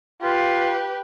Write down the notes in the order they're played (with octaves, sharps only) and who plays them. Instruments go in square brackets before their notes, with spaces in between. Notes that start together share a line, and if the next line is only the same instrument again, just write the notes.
[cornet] F4 [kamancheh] G4 B4